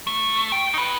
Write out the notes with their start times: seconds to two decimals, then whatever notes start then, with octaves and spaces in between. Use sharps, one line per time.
0.07 A3
0.52 G5
0.74 D#4 B4